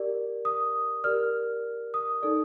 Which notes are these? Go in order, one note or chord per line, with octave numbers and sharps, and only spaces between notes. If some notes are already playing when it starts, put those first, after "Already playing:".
Already playing: G4 A#4 D5
D#6
G4 A#4 D5 F6
D#6
D#4 A4 D5